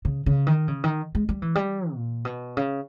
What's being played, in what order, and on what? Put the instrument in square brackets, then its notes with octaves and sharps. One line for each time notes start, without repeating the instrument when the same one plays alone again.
[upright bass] C#3
C#3
D#3
C#3
D#3
G#3
G3
E3
G3
A#2
B2
C#3